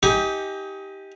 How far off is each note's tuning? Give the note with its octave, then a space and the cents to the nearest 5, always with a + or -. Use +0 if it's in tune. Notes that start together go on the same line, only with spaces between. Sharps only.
D#4 +25 G4 +0 G#5 +0